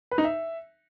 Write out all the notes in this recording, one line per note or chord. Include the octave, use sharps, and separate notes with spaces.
B4
D#4
E5